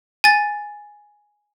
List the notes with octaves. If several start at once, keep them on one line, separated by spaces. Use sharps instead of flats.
G#5 A6